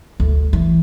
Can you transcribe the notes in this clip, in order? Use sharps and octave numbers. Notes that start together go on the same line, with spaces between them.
D2
E3